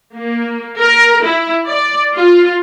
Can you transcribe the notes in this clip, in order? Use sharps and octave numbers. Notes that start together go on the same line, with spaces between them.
A#3
A#4
E4
D5
F4